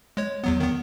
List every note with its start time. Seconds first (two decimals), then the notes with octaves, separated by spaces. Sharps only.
0.17 G#3 C#5
0.44 E2 F#3 B3
0.60 D#3 B3